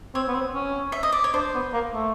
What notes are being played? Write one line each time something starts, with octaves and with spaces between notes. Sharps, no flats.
C4 C#5
B3
C4
C#4
E5
D#5
D5
C#5
D4 C5
B3
A#3
A3